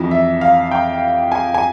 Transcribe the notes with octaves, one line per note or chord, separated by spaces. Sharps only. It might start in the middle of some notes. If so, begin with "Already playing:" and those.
Already playing: F2 E3
E5
F5
G5
G#5
G#5